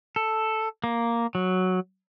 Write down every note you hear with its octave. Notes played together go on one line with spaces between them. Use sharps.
A4
A#3
F#3